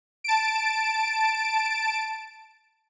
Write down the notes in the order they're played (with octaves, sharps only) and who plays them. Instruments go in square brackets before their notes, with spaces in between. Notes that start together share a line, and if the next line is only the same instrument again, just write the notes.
[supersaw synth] A5 D7